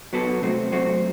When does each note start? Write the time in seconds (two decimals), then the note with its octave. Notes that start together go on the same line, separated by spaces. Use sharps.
0.13 F#3 B3 F#4 A4
0.42 C3 F#3 A3 C4 F#4
0.72 C3 F#3 A3 C4 F#4